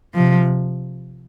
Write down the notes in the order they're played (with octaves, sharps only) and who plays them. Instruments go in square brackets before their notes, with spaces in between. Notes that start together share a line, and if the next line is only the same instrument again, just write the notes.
[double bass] C3 [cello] F3